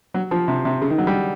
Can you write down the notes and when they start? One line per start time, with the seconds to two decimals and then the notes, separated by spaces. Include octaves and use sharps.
0.14 F#3
0.31 F3
0.48 C3
0.65 C3
0.82 C#3
0.90 D#3
0.98 F#3
1.07 G3